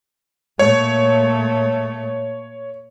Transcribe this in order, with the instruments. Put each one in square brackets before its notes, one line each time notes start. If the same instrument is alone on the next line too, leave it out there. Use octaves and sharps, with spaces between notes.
[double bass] A#2 A3 [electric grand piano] C#5